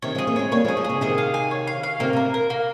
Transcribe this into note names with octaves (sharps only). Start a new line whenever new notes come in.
C3 D#3 C#5
F3 G#3 G#4
A#3 C#4
G#3 C4 C#5
G3 A#3 C#5
F3 G#3
G#4
F3 G#3
C#3 G#4
C3 D#3 G#4
F5
G#5
C#5
F5
F5
C3 D#3 A#3
C3 A#4
A#4
A#3